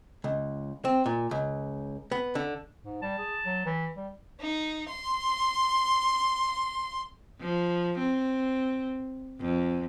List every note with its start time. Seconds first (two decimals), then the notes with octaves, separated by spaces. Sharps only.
0.24 C#2
0.85 C4
1.06 A#2
1.31 C#2
2.11 B3
2.35 D3
2.83 G#2
3.02 G3 A5
3.19 G#4
3.46 F#3
3.66 E3
3.97 G3
4.41 D#4
4.89 C6
7.40 F3
7.99 C4
9.40 F2